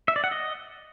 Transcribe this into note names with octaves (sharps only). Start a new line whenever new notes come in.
E5
D5
F#5
D#5